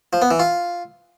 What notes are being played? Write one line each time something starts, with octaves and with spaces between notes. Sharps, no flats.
F3
B3
E3
F4